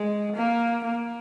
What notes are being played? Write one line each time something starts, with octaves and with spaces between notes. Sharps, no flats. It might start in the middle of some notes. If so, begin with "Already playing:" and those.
Already playing: G#3
A#3
A#3